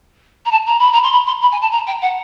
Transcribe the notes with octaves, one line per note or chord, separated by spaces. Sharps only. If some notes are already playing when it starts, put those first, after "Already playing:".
A#5
A5
A#5
B5
A#5
C6
B5
C6
B5
G#5
A5
A#5
G5
F#5